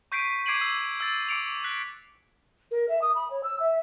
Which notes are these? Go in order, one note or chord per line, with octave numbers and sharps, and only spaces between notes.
C#6 G6 B6 C7 D7 D#7
D6 G#6 C7 D7 D#7 F#7
E6 C7
E6 A6
D6 C#7 D7 F7
F#6 B6
A#4
E5
D#6
B5
C#5
E6
E5